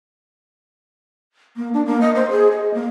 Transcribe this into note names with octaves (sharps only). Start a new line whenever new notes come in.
A#3
D4
A#3
D#5
C5
G#4
D#5
A#3